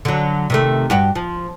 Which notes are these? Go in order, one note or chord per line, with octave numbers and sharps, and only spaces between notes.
D3 F#3
C3 D#3 A3
G2 F#4 G4
F3